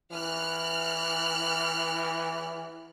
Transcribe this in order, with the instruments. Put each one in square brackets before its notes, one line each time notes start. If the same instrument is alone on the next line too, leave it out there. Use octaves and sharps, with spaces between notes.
[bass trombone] E3 [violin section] F6 F#6